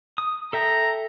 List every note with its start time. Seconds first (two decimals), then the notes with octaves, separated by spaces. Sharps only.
0.18 D#6
0.53 A4 E5 G5 A#5